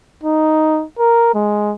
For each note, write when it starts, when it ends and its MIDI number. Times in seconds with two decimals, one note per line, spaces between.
0.24 0.84 63
0.99 1.32 70
1.34 1.73 56